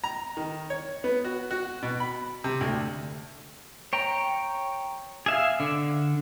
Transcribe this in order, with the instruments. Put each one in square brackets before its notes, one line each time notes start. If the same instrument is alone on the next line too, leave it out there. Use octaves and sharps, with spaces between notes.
[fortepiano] A#5
D#3
C#5
B3
F#4
F#4
B2
B5
C3
D2
[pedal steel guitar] C#5 G5 A#5
G#4 E5 F5
D3